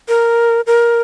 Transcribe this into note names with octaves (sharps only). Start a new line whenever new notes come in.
A#4
A#4